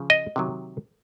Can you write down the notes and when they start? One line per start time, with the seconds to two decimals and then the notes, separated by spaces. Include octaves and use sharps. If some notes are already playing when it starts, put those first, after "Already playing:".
Already playing: C#3 F3
0.10 D#5
0.36 C3 D#3 F#3